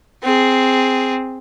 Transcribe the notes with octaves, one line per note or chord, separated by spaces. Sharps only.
C4 G#4